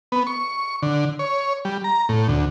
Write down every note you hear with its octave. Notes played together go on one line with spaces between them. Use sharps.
B3
C#6
D3
C#5
G3
A#5
A2
D2